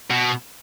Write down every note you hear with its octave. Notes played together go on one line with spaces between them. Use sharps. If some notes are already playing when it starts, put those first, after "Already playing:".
B2